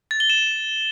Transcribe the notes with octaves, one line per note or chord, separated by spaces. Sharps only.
A6
G7
E7